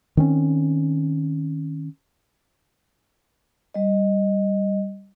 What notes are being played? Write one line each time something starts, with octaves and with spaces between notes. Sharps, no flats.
D#3 C4 C#4
G3 D#5